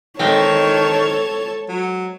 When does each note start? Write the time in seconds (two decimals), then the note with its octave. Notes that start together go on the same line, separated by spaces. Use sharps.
0.19 D#3 G#3 C4 A4 C#5 A5 G#6
1.68 F#3